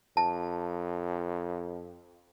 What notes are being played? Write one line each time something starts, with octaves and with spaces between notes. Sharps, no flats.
F2 A5